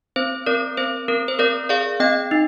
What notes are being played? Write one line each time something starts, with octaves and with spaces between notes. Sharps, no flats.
C4 C5
C4 A#4 D5
C4 C5
C4 A#4
C5
C4 A#4 D5
G#4 D5 F5
C4 D#5 G5
D#4